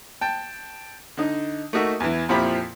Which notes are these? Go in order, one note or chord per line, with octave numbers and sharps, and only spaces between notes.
G5 A5
D3 D#4
A3 A#3 D#4 F#4 E5
E2 E3
F2 A#2 F3 E4 G4 B5